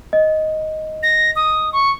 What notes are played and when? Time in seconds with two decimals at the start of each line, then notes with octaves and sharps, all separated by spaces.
0.13 D#5
1.03 A#6
1.36 D#6
1.73 C#6